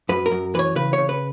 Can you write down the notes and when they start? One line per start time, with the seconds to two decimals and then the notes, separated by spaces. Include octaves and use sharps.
0.09 F#2 B4
0.26 A#4
0.31 F#2
0.54 E3 B4
0.59 C#5
0.75 C#3 B4
0.93 C#3 C#5
1.09 B4